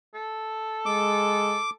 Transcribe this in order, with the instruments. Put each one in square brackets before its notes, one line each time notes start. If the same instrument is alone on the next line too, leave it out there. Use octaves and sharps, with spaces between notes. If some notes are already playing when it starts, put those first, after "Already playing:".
[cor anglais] A4
[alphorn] G#3 [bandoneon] D6